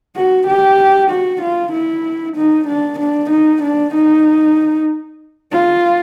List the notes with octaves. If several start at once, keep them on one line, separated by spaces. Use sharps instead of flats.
F#4
G4
F#4
F4
E4
D#4
D4
D4
D#4
D4
D#4
F4